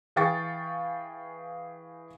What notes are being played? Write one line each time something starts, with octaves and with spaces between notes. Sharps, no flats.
E3 G#4 F5 G5 C#6 A6